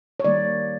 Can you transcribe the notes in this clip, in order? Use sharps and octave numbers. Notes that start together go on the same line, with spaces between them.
C#5
D#3 G3 A#3 D5